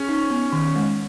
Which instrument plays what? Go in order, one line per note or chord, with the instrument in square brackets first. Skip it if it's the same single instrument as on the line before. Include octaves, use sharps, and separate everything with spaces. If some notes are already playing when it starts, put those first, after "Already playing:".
Already playing: [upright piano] C#4 [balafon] G#4
[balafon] D#4
B3
D#3
G#3